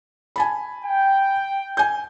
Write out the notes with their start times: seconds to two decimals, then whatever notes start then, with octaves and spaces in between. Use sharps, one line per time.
0.36 G#5 A5 B5
0.85 G5
1.77 G#5 G6